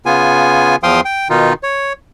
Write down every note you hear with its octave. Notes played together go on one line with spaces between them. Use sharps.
C#3 B3 F4 G#5
E2 F3 F5 G5 C6 D#6
G5
B2 D#3 D#4 F4
C#5